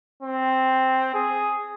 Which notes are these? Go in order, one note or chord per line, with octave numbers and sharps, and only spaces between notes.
C4
G#4